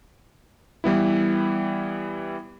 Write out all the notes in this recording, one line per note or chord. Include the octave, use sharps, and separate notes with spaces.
E3 G3 B3 E4